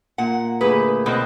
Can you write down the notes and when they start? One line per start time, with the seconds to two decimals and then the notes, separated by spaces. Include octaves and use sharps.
0.18 A#2 F#5
0.61 D2 G#4 B4 D#6
1.06 B2 C4 D#5 F#5 G5